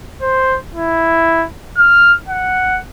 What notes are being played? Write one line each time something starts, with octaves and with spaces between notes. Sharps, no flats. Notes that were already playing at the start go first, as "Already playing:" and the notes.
C5
E4
F6
F#5